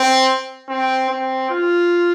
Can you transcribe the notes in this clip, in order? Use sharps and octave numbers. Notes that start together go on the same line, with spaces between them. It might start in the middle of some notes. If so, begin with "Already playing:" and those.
Already playing: C4
C4
C4
F4